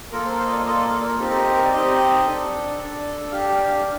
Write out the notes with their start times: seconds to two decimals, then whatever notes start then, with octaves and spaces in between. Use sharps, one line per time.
0.12 A#3 F4 A4 A#4
0.26 C5
0.39 C5
0.46 D#5
0.52 D5
0.65 A#3 F4 A4 D#5
0.80 D5
0.93 A4
1.06 A#4
1.19 C4 D#4 G4 A4
1.30 A4
1.36 A#4
1.55 A#4
1.64 D5
1.72 C4 D#4 G4 D#5
2.26 D4 A4
2.78 D4 A4
3.32 D4 G4 F5
3.49 G5
3.67 F5